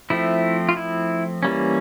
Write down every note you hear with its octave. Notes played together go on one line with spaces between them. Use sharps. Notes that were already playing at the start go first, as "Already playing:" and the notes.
F3 A3 C4 E4
F4
E4
E3 G3 A#3 C#4